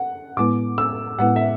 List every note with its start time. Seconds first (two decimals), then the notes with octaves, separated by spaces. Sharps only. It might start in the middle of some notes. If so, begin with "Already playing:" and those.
Already playing: F#5
0.37 A2 G#3 B3 E4 B4 D6
0.78 E6
1.19 A2 G#3 B3 E4 B4 F#5
1.36 E5